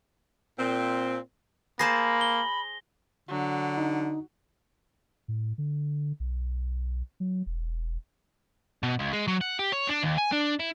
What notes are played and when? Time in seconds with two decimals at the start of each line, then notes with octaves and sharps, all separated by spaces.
0.58 A#2 C4
1.79 A#3 G#4 C5 A5 B5 A#6
2.21 G7
3.29 D3 F#3
3.78 D#4
5.28 A2
5.58 D3
6.20 B1
7.20 F#3
7.46 E1
8.83 B2
8.99 C#2
9.13 G#3
9.28 F#3
9.41 F#5
9.59 G4
9.72 C#5
9.88 D4
10.03 D#2
10.18 G#5
10.32 D4
10.59 E4